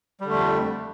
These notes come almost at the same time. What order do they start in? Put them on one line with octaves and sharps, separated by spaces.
G3 D3 A3 F2